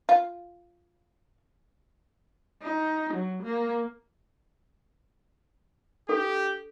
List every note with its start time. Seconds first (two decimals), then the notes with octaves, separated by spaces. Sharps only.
0.09 F4
2.62 D#4
3.14 F#3
3.43 A#3
6.09 D4 G4 A4